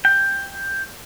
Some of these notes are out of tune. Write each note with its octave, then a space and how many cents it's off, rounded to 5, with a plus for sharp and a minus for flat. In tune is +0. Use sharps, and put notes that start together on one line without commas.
G5 +10